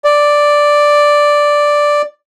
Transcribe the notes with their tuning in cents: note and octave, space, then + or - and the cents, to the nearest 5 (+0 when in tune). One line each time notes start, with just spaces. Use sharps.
D5 +0